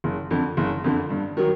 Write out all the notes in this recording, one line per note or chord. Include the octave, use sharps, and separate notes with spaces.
F#1
F2 D3
F#1
F2 D3
G2
D#3 F#3